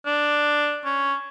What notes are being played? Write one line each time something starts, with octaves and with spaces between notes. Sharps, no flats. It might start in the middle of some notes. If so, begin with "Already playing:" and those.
D4
C#4